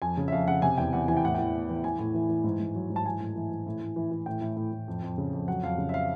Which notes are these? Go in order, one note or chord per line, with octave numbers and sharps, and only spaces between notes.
F2 G#5
C#3
E5
F2 F5
C#3 F#5
C3 G#5
E2 G5
E2 F#5
E3 G#5
G5
A2 F#5
E3 G5
A2
E3
E3 G#5
A2
E3
E3
G#2
G#2
F#3
G#2
A5
E3 G#5
A2
E3
E3
A2
A2
E3
E3
A2 G5
A2
A2
A2
F2
F2
C#3
F2
F#3 F#5
F2 F5
C#3
E5
F5